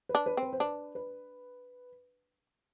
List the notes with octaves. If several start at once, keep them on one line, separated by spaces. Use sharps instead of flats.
B4
D4
B4
C4
B4
C5
D4 B4
B4